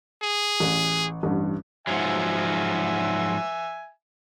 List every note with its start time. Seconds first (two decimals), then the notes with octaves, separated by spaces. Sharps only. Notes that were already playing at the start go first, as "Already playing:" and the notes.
0.22 G#4
0.60 A1
1.23 A1 G2
1.87 G#2 F3 F#3 E5 G#5